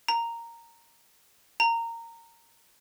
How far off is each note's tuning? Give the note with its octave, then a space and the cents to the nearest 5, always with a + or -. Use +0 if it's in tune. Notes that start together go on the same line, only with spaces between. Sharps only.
A#5 -5
A#5 -15